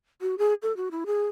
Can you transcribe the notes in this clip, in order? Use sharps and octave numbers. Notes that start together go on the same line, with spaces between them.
F#4
G#4
A4
F#4
E4
G#4